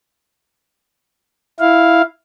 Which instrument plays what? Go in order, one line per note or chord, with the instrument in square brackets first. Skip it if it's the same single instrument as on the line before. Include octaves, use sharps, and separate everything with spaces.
[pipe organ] E4 F5